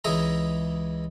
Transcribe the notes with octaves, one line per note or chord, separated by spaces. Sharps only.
C#2 E3 G#3 D#5 E5 A#5